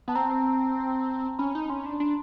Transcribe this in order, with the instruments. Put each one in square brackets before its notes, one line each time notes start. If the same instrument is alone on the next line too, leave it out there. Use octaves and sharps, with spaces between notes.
[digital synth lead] B3 [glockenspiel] A5
[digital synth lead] C4 [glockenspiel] A#5
[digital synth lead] C#4 [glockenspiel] B5
[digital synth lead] D#4
[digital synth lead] C#4 [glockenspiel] C6
[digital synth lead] D4
D4